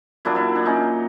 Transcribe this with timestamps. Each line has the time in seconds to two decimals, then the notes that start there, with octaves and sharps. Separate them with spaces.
0.25 A#2 F#3 A#3 D4 E4
0.35 D4 E4
0.56 D4
0.65 C#4 D#4